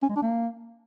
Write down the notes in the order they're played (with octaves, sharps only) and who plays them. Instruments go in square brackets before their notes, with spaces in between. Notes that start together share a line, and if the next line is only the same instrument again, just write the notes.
[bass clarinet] C#4
G#3
D4
A#3